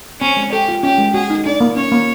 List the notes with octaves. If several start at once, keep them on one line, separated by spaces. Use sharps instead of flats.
C4 C#4
G#3
G4 A4
F4
C#4 G4
G#3
F#4 G#4
D#4
D4 D5
A#3
C#4 C#5
A#3